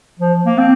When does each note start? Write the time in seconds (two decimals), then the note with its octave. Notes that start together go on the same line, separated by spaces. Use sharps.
0.19 F3
0.45 A#3
0.58 C4